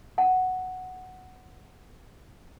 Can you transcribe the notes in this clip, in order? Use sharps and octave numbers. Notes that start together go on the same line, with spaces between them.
F#5 A5